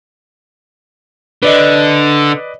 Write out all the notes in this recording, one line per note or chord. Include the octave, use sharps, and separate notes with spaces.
D3 B4 D5 D#5